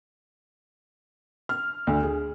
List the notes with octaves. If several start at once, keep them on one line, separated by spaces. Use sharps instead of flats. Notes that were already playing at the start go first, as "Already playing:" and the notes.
F6
D2
G#4